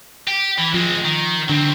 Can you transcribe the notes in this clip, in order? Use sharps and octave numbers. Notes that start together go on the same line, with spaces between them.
G4
E3
F3 G#3 C4
D#3
D3 F#3 C4